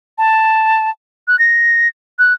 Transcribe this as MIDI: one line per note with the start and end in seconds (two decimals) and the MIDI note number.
0.18 0.90 81
1.28 1.38 90
1.39 1.88 94
2.19 2.33 90